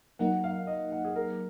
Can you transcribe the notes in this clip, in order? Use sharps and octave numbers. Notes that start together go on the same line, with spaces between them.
F#3 A#3 D#4 A#4 F#5
F5
D#5
F#5
G#4
A#4